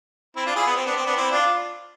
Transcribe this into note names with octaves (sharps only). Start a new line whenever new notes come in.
C4 E4
D4 F4
E4 G#4
B3
C4
B3 D4
C4
B3 D4
C4 E4
D4 F4